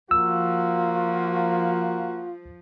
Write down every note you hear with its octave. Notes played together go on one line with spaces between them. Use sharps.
F3 A#3 F4 F#4 E6